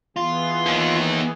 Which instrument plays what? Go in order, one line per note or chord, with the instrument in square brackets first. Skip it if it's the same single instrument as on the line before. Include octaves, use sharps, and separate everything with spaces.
[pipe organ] E3 B3 G#4 [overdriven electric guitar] F4
[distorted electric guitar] D#2 D#3